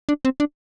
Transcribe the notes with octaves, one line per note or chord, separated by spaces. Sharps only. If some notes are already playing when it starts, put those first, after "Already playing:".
D4
C4
D4